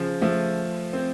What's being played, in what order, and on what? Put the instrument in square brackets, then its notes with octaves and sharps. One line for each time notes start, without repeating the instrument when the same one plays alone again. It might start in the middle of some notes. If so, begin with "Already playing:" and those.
Already playing: [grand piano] C#3 F3
F3 A3
C4